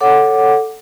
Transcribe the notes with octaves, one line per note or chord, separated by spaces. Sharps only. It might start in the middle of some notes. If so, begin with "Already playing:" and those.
A4 C#5 F#5 D6